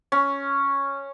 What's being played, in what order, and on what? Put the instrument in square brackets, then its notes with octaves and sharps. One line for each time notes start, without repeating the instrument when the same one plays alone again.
[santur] C#4